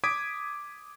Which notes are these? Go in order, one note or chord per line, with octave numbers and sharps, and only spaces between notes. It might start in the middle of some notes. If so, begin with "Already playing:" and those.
D6 D#6 G#6 B6 D7